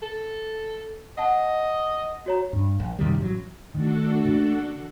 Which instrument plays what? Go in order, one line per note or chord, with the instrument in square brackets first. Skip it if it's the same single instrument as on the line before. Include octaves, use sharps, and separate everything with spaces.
[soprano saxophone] A4
[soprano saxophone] D#5 [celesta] F#5 A5
[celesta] F#4 C#5 A#5
[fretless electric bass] G2
A#1
F#2 C3 D#3 G3
A1 F#3
[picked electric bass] D#3 [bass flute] A3 [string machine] D4 F#4 A4
[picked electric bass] C#3 E3 A#3